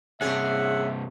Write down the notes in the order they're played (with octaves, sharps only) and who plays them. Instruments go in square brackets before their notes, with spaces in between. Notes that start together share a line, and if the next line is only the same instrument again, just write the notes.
[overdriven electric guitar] G2 C3 [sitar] C#4 G#4 [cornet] E5 [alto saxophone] F#5